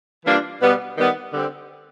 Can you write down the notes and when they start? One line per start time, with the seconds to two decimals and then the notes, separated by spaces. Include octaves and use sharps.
0.24 E3 G3 A#3 D4 F4
0.60 B2 G3 B3
0.97 D#3 G3 B3
1.32 D3 G3 C4